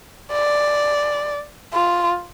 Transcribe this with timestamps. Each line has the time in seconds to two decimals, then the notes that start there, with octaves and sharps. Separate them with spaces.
0.32 D5
1.74 F4